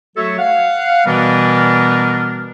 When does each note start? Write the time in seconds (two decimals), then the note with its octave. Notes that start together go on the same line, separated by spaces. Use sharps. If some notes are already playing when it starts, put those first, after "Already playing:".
0.16 F#3 A3 F#4 A4 C#5 E5
0.38 F5 F#5
1.05 B2 E3 G3 B3 D4 A#4